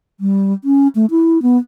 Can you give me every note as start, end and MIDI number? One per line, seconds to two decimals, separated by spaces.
0.20 0.53 55
0.64 0.88 61
0.95 1.06 57
1.11 1.41 64
1.42 1.58 59